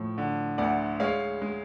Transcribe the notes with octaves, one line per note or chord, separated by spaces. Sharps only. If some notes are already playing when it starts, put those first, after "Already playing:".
Already playing: A2 F3
D3
D2 D5 F#5
G#3 C#5 F5
G#3